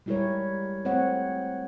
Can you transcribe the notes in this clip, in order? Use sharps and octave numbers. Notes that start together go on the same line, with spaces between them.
G3 G#3 E4 G4 A#4 C#5
A3 C4 C#5 D#5 F#5